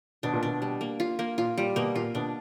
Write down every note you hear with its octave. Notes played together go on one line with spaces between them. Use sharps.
B2 D4
A#2
B2 D4
G3
A#3
F4
A#3
A#2 F4
A#2 G3
B2 A#3
A#2 F4
B2 D4